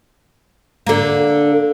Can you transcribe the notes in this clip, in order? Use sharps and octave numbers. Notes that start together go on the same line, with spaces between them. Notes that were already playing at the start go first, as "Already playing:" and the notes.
D3 A#3